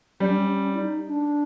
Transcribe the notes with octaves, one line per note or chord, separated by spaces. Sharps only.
G3 C#4
D4
C#4
C#4
E4
D#4
D4